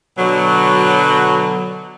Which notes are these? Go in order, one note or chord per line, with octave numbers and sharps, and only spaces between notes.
B2 D3 F#3